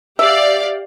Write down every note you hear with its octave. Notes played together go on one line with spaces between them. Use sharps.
G4 D5 E5 F5